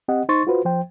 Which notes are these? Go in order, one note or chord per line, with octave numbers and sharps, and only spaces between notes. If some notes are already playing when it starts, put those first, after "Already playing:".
C4 G4 D#5 F#5
D#4 C5 C6 C#6 A6
F4 F#4 B4 C5
F3 C5 G5